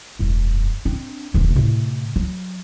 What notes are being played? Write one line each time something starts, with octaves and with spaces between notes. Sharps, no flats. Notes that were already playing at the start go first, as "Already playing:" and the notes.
E1 F#2
C4 D4
D#1 E3
A2 C3
F#3